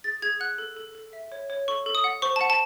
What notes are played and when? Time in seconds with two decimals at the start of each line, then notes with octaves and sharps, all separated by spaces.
0.04 G#4 A6
0.22 G#4 G#6
0.40 F#5 F#6
0.58 A4
0.77 A4
0.95 A4
1.13 E5
1.32 C#5
1.50 C#5
1.68 A4 C#6
1.86 A4
1.95 D#6
2.04 F#5
2.22 C5 C#6
2.36 F#5 A5
2.50 A5